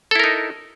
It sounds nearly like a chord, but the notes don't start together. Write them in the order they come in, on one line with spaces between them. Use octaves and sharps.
A4 E4 A#4 D#4